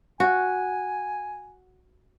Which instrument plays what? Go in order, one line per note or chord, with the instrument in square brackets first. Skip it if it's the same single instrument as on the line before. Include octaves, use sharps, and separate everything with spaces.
[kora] F#4 [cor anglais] G#5